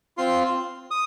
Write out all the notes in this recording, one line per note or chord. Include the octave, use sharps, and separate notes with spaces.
C4 F4 C6
D#6